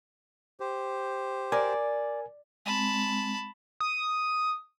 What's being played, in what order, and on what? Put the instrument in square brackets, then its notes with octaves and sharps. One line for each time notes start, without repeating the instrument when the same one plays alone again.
[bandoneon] G4 C5
[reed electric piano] A#4 G#5 [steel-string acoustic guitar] D5
[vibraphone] G#3 C4 [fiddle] A5 B5
[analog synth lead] D#6